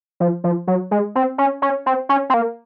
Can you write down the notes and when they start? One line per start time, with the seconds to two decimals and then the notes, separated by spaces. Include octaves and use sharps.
0.20 F3
0.44 F3
0.67 F#3
0.91 G#3
1.15 C4
1.38 C#4
1.62 C#4
1.86 C4
2.09 C#4
2.30 C4
2.34 A#3